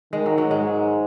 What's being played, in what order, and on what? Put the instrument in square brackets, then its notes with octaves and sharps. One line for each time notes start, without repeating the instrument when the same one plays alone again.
[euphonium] D#3 [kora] G#3
[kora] F#3
F#3
[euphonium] G#2 [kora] G#3